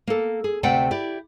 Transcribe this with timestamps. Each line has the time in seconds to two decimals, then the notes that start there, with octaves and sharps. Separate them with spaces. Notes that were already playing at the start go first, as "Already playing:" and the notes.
0.07 A#3 A4
0.44 G#4
0.63 D2 C3 A3 D5 F#5 G5
0.91 E4 G4 D5